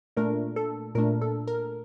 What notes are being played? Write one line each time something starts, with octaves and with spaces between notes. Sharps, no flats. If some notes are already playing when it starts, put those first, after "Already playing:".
A#2 A3 D4 A#4
A4
A#2 A3 D4 A#4
A4
A#4